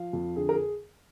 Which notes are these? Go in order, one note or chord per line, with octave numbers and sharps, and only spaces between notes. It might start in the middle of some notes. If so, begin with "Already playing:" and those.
Already playing: F3 F5
F2
D3 G#4
A#4
G#4